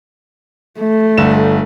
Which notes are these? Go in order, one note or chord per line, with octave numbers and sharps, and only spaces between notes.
A3
G1 D3 E7